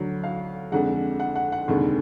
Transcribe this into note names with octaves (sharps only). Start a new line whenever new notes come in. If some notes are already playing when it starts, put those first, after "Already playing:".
Already playing: D2 D3 F#3
F5
F2 D3 G#3 F#5
F#5
F#5
F#5
F1 D#2 D3 G#3